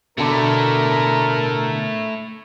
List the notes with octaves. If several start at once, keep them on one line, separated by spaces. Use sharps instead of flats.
B2 D3 A3 E4 A#4